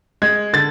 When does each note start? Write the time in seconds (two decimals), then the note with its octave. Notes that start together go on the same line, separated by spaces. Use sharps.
0.22 G#3 G#6
0.53 D3 A6